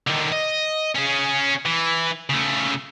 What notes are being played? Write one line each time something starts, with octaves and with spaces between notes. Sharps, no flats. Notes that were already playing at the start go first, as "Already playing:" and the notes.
D3 D#3
D#5
C#4 G#4
E3
C#3 A3